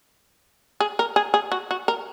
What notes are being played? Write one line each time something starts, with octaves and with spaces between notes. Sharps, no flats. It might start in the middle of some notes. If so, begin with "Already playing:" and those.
G#4
A#4
G#4
G#4
F#4
F#4
A#4